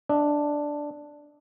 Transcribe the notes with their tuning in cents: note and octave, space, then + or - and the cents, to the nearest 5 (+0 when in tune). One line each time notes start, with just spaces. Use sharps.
D4 +0 D#5 +35